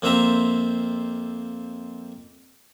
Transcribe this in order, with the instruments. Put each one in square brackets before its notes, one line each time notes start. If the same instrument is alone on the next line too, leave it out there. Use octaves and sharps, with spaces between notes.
[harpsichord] F2 A#3 C4 C5 E5 A#5